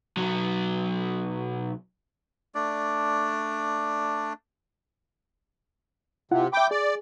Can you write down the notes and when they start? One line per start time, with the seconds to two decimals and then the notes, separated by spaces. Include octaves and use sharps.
0.17 B1 F#3
2.55 A3 D4 D5
6.31 C3 E4 F4 F#5
6.53 E5 G5 B5 D6
6.71 G#4 D5